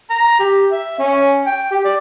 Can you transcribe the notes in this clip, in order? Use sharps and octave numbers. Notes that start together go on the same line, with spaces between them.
A#5
G4
E5
C#4
G5
G4
D5